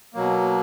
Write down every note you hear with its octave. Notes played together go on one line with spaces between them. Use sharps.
B2 F#3 A#3